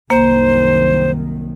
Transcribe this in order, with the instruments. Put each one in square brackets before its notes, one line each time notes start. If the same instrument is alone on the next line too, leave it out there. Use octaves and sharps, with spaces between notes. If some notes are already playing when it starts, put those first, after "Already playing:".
[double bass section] C2 F#2 D#3 [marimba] A#3 [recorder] C5